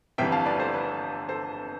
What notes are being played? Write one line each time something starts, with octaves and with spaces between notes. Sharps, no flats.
G1 F2 E3 G3 B3 E5 G5
F5 A5
B4 D5
A4 C5
B4
A4 C5